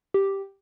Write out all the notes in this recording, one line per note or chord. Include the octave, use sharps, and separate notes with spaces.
G4